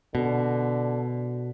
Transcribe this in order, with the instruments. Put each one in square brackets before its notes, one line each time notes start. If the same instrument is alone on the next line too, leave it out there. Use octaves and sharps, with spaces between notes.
[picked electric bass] B2 [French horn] D3